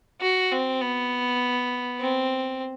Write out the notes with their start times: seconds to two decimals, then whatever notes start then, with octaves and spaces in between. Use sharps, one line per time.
0.21 F#4
0.51 C4
0.81 B3
2.00 C4